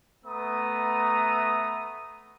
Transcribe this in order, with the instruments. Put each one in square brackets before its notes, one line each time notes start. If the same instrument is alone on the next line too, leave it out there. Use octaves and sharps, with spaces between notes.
[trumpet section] A3 B3 A#5 D#6